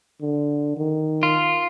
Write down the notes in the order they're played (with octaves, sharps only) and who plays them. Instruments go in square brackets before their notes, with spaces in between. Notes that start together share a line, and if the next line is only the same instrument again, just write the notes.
[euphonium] D3
D#3
[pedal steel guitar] F4